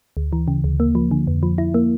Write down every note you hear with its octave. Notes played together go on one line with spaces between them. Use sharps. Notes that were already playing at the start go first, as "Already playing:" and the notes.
D2
E3
C#3
D2
A#3
F3
D3
F2
F3
E4
A#3